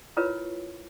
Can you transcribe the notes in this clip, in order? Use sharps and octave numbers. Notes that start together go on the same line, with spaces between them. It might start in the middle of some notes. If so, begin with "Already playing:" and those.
E4 F4 A#4 B4 C#5